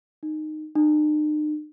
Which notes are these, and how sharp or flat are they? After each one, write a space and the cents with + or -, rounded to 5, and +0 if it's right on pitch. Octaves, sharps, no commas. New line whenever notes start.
D#4 -15
D#4 -45